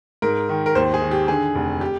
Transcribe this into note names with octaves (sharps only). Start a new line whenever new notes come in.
G#2 A#4
D#3
A#4
D#2 C5
G#4
D#3
G4
D3 G#4
F1
G4